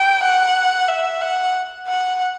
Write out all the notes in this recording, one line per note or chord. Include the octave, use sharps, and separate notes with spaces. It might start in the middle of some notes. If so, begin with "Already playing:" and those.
Already playing: G5
F#5
E5
F#5
F#5